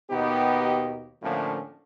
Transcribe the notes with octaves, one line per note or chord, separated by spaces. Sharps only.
D#2 B2 B3 D#4 G4
A2 D3 F3 A3 A#3 C#4